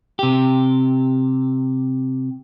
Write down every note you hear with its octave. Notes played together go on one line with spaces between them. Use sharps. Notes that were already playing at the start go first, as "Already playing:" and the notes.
C3 G4